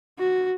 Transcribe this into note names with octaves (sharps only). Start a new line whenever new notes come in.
F#4